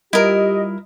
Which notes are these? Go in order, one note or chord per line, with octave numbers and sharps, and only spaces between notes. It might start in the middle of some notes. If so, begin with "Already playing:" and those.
G3 E4 F4 G4 A#4 D#5